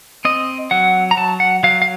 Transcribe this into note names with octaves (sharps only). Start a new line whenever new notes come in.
C4 D#5
F#3 F#5
A#5
F#3 A5
F#5
F#3 F5
F5